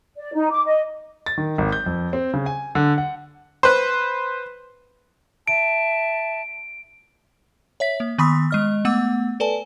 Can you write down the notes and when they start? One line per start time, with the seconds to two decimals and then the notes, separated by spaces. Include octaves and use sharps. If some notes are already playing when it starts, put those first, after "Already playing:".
0.17 D5
0.33 D#4
0.51 D6
0.65 D#5
1.26 A6
1.38 D#3
1.58 G#1
1.72 G6
1.86 F2
2.13 C4
2.34 C#3
2.46 G#5
2.75 D3
2.98 F#5
3.63 B4 C5
5.48 E5 A5 D7
7.80 C#5 E5 B6
8.00 A#3
8.18 D#3 B3 B5 C6 D#6 B6
8.51 G#3 D#5 F6
8.85 A3 B3 F#5 D6 E6
9.40 A4 B4 D5 G#5 A5